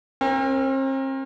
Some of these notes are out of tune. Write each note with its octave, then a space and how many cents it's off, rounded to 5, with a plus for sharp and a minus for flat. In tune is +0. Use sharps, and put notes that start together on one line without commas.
C4 +40 A#4 +0